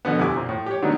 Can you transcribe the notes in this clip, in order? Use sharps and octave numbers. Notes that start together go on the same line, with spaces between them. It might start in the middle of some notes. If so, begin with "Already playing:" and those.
F2 B2 D3 B3
D2 C3 E4 G#5 D6
A#2 C4
A2
G4 C#5
D3 D#3 F#3 A3 B3 D4